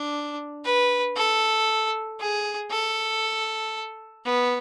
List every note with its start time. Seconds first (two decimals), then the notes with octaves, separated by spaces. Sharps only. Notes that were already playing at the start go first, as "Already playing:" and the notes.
Already playing: D4
0.65 B4
1.16 A4
2.20 G#4
2.71 A4
4.25 B3